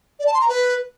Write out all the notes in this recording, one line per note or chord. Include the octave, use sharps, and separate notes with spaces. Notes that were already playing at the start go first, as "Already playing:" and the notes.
D5
A5
C6
A#5
B4